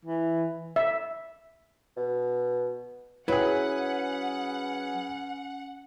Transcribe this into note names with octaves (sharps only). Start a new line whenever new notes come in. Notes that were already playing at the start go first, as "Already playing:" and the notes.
E3
E5
B2
F#3 C#4 E4 G#4 B4 F#5